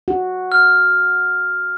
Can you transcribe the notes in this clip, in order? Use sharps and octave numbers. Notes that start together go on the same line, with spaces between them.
F#4
F6